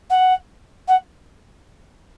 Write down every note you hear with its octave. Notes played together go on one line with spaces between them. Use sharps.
F#5
F#5